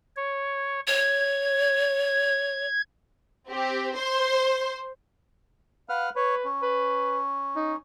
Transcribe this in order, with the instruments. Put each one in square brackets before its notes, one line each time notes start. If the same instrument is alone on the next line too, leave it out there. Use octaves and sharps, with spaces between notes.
[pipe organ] C#5
[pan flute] C#5 [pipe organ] G#6
[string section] C4 G4
C5 C6
[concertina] B4 F#5 F6 [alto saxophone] F5
[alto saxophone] B4 [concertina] C#5
[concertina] C#4
[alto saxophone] B4
D#4